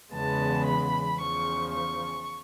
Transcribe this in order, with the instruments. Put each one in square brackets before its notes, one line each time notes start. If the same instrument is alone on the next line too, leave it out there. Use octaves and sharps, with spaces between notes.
[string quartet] E2 C#3 E3 G#3 B3 A5
B5
E2 C#3 F3 C#6
C#6